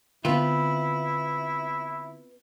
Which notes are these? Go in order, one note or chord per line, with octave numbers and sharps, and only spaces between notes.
D3 B3 C4 E4 F4